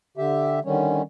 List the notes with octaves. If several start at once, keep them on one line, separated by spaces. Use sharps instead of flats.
D3 G4 E5
D3 D#3 G3 C#4